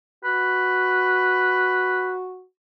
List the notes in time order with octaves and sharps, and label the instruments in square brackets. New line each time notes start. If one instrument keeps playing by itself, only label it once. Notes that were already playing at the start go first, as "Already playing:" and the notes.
[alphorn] F#4 [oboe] B4